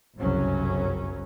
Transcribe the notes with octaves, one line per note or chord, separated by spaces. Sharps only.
G1 C2 F#2 C#3 F#3 C#4